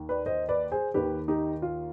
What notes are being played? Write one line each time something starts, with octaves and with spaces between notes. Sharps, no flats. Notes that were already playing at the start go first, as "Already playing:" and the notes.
Already playing: D#2 D#3
B4 D5
C5 D#5
B4 D5
G#4 C5
D#2 D#3 G4 B4
D#4 G4
F4